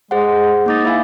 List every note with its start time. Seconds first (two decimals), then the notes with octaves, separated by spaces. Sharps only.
0.11 G#3 G#4 C5 F#5
0.66 A#3 D#4 D6 A6
0.85 E4 E5 F5 G#5